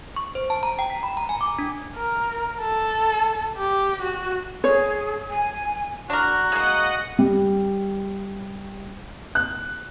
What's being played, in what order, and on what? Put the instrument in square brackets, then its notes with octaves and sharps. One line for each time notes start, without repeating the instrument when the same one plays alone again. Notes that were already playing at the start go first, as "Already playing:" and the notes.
[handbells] C#6
C5
A5
A#5
G5
B6
B5
A#5
G#5
D6
D4
[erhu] A#4
A4
G4
F#4
[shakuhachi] G#4 [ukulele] C#5
[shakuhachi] G#5
[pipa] D4 A#4 [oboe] F#4
[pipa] G#3 A#3 [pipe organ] D#5 F#5
[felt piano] G3
F#6